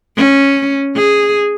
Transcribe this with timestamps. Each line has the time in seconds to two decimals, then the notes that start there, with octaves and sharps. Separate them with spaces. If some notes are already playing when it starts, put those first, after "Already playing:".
0.17 C#4
0.96 G#4